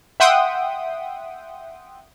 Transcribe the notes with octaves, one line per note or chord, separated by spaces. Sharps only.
E5 F#5 G5 C6 D#6